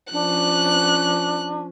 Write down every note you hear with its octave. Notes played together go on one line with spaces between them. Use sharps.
F3 C#4 D4 F#6